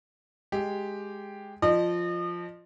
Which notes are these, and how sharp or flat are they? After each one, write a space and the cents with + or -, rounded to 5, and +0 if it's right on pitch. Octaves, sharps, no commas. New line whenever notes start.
G#3 +0 G4 +0
F3 +0 D#5 -35